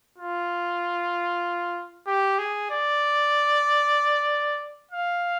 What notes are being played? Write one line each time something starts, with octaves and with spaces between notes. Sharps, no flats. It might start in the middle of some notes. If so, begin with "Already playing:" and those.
F4
G4
G#4
D5
F5